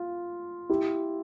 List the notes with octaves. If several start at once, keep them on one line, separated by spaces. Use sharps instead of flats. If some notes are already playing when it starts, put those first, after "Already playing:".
Already playing: F4
E4 G4